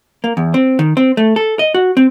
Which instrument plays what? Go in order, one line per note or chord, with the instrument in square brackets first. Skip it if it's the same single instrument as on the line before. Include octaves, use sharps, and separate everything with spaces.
[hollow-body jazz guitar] A#3
E2
C4
D#3
C4
A3
A4
D#5
F#4
C4